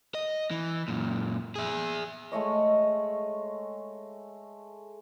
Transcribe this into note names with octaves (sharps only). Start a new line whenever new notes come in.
D#5
E3
F#2 A#2
G#4 E5
G#3 A3 C#5 D#5